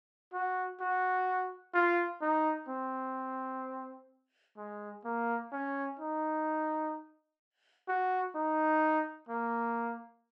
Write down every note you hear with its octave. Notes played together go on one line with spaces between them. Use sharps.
F#4
F#4
F4
D#4
C4
G#3
A#3
C#4
D#4
F#4
D#4
A#3